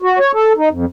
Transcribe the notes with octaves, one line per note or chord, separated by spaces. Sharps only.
F#4
C#5
A4
D#4
F2